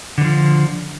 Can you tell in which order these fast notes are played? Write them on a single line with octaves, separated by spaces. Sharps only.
D3 E3 F3